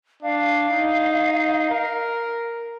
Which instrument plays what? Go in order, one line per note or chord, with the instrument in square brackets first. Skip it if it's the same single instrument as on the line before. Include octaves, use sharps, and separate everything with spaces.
[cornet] D4 [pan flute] F5
[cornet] D#4
A#4